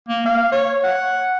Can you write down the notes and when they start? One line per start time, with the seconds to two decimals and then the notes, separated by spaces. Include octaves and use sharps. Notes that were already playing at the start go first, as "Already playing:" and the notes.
0.09 A#3
0.26 F5
0.52 C#5
0.83 F#5